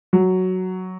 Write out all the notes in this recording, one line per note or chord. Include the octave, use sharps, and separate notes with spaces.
F#3